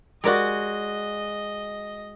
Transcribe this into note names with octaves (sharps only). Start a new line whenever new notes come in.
G#3 F#4 G4 A#4 D5 D#5